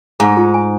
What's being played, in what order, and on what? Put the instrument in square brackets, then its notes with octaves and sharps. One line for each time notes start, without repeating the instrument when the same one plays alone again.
[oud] G#2 [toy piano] G#4
[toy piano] F4
G#5